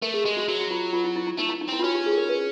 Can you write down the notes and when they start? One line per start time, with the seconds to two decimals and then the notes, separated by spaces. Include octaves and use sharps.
0.02 A3 A#4
0.14 G#4
0.25 G#3 G4
0.37 F#4
0.48 F#3 F#4
0.61 F#4
0.71 F4
0.93 F4
1.04 E4
1.16 E4
1.27 E4
1.38 A3 D#4
1.49 E4
1.61 D#4
1.69 C4 E4
1.79 F4
1.84 C#4 F#4
1.95 G4
2.06 G#4
2.12 A4
2.17 A#4
2.29 B4